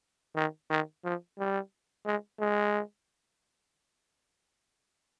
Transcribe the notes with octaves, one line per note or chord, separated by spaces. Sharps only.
D#3
D#3
F3
G3
G#3
G#3